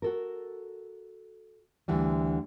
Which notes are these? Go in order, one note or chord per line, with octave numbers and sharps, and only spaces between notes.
F#4 A4 A#4
D2 D3 E3 G3